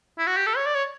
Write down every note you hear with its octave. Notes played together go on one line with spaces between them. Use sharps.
E4
F#4
G4
A4
C#5
D5
C#5